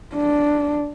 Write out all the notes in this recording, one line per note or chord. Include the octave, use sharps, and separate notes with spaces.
D4